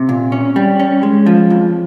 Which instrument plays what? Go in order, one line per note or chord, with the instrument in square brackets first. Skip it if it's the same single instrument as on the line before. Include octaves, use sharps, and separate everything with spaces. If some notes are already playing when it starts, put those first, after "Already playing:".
Already playing: [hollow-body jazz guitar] C3
A#2
C#4
G3
C#4
G#3
F3
F2